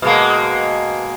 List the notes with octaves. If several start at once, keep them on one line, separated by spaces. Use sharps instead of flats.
B2 G#3 A#3